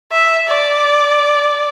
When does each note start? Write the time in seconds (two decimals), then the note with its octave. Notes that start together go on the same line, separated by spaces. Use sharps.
0.12 E5
0.47 D5